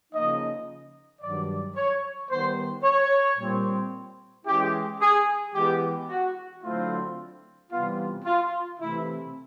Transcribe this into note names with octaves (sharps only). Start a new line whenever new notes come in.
C#3 F3 A#3 D#4 D#5
G2 D#3 F#3 D5
C#5
D#3 G3 B3 C5
C#5
A#2 G3 C4
E3 G#3 C#4 E4 G4
G#4
E3 G#3 B3 G4
F#4
D3 F#3 A3 C4 E4 F4
C3 E3 G3 B3 F4
F4
C3 E3 A3 E4